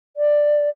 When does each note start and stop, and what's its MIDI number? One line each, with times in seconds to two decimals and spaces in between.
0.17 0.69 74